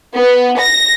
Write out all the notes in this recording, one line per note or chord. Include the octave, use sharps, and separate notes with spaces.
B3
A#6